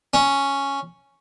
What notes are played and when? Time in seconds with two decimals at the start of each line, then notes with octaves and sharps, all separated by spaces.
0.14 C#4